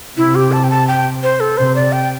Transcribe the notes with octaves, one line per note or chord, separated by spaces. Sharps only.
C3 E4
G4
A5
G5
A5
G5
C5
A4
C3 C5
D5
G5